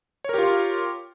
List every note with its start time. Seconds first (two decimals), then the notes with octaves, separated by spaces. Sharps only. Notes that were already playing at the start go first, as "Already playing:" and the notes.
0.25 C#5
0.29 A#4
0.34 G4
0.38 F4